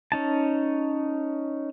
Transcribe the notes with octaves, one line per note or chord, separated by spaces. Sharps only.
C#4 D#4 A5